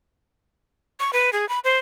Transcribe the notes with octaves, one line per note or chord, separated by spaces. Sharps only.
C#6
B4
G#4
B5
C5